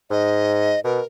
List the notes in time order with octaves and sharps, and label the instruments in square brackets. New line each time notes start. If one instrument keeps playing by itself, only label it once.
[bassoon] G#2 [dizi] D#5
[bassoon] B2 [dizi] A#4